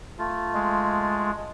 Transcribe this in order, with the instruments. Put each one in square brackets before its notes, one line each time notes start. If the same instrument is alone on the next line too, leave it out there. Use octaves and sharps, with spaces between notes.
[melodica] A3 F4
[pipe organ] G#3